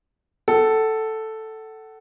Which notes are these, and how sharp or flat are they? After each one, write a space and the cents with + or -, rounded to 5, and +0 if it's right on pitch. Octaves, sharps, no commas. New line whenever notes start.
A4 +0 F#5 +30